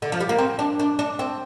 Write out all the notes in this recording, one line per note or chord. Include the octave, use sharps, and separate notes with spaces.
D3
F3
G3
A#3
C4
D4
D4
D4
C4